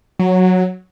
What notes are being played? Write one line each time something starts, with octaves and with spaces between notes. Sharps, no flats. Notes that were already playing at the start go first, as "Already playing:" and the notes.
F#3